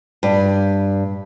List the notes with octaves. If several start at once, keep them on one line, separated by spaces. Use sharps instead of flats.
G2